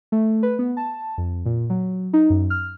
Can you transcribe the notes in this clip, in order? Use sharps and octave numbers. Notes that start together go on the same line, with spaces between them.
A3
B4
B3
A5
F2
A#2
F#3
D#4
F#2
F6